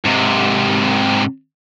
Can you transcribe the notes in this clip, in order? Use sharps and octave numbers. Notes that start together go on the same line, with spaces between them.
G#2 C3